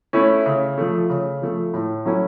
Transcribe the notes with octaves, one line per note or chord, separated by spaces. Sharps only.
A3 C#4 E4
C#3
F3 A3
C#3
F3 A3
A2
F#3 A3 C#4 E4